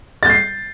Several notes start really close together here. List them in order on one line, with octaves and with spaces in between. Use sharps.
A6 G6 C7